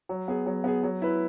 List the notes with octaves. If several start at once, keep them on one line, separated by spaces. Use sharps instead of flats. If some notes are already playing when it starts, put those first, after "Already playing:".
F#3
B3 G#4
F#3
B3 G#4
F#3
E4 B4